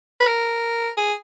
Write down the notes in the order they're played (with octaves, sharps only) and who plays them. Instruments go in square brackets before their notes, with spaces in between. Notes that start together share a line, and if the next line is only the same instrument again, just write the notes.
[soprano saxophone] B4
A#4
G#4